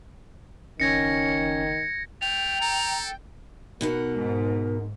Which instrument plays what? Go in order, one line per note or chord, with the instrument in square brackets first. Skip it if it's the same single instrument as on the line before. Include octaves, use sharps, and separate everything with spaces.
[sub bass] F#1 [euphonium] D#3 [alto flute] C#4 [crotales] G#6 A#6 C#7
[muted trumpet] A3 [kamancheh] G5 [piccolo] F7
[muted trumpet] A4 [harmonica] A#5
[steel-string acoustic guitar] B2 D#4 F#5 [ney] A#4
[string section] G#2